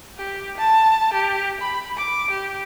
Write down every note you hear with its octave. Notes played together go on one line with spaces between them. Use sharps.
G4
A5
G4
B5
D6
G4